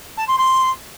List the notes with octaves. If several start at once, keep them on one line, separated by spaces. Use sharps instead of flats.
A5
C6
C6